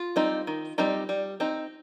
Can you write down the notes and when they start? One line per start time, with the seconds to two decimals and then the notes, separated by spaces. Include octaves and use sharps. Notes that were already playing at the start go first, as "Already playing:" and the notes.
Already playing: F4
0.16 G3 C4 D#4
0.47 D#3
0.78 G3 C4 D#4
1.09 G3
1.40 C4 D#4